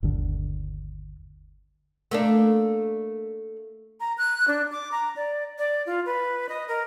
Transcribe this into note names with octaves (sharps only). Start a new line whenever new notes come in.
G1 D#2 D3
A3 A#3 D4
A#5
F#6
D4
D6
A#5
D5
D5
F4
B4
D#5
A#4